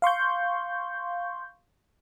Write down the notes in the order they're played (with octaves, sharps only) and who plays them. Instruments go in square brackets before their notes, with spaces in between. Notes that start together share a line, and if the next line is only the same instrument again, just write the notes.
[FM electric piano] F5 C6 C#6 G6